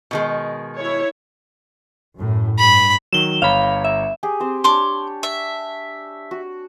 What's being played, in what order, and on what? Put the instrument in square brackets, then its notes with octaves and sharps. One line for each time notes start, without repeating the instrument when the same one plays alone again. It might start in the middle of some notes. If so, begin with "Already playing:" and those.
[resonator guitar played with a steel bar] B2 D#3 G#3
[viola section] E4 C#5
[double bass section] F#2 A2
[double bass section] G2 [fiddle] B5
[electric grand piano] D#3 F#3 [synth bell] E7 G7
[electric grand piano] G1 C#5 A#5 [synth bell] F5 B5
[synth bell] E5
[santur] G4 G#4
C4 G4 C5
[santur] D4 C#5 [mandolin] C6 D6
[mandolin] E5
[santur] F#4